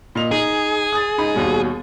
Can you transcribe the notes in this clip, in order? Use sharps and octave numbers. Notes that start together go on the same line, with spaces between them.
A#2 D#5 F7
D#4 G#4
D#6 A6
C#2 D#4 B5
D#2 B2 G3